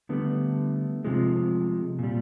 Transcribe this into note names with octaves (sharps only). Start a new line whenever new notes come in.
D3 G3 A3 B3
C3 F3 G#3
A#2 G3